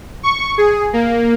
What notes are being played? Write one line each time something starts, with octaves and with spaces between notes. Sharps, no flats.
C#6
G#4
A#3